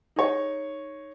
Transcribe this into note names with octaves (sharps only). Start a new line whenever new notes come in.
D#4 G#4 C#5